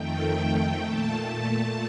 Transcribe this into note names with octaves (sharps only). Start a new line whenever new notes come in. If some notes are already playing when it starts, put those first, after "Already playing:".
Already playing: F2 D#3 A3 G5
G5
A#2 A3 A5